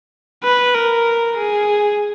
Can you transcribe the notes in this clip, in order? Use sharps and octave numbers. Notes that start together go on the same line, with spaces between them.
B4
A#4
G#4